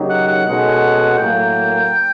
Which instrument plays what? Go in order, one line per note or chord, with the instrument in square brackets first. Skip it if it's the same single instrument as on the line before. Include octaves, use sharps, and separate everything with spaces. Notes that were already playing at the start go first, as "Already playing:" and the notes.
Already playing: [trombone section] C#3 F#3 A#3 D#4 G4
[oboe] F#5
F#5
[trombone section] B2 G#3 C#4 F#4 A4 [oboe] F#5
[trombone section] A2 F#3 A#3 [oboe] G5